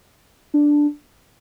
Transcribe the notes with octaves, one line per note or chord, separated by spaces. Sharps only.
D4